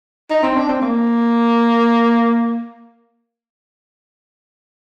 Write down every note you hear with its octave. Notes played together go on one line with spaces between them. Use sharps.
D#4
C4
D4
C4
A#3